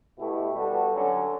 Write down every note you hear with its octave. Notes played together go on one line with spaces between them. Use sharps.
B2 A3 E4 G4 B4
G3 B3 F#4 A4
D3 F#3 C#4